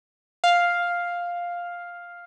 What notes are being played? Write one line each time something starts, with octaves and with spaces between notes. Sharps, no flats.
F5